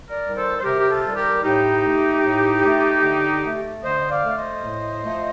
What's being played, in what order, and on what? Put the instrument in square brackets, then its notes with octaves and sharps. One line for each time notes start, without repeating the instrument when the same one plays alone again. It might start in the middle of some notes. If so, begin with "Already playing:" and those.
[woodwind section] A#4 D5
D#3 G3
A4 C5
C5
C3 G4 A#4
G4
F4 A4
D#3 G3
G4 A#4
A2 D#4 G4
A3
A2
A3
D3
A3
D3 C5 D#5
D#5
D5 F5
A3
C5 D#5
A2
F3 A3